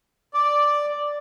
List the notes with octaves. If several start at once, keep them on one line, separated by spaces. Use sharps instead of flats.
D5